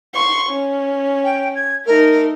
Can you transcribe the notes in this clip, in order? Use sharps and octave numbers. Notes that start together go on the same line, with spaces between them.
C6 C#6
C#4
G5
G#6
A3 D#4 A#4